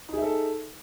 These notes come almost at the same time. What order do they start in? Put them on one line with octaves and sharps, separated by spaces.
D#4 G#4 E5 A4